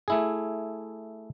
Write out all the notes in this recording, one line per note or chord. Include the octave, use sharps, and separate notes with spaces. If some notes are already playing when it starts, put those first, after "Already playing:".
A3 E4 G#4